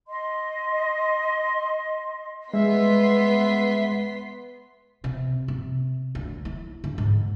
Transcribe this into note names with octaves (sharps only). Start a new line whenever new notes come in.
D#5 C6
G#3 B3 E5 C6 B6
C3
C3
D2
E4
D3
G#2